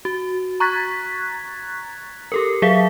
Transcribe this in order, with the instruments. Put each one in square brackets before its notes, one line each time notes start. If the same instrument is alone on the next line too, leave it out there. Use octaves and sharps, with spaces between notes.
[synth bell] F#4
A#5 C#6 F#6 G#6 A6 B6
G4 A4 A#4
F#3 G#4 E5 F5 B6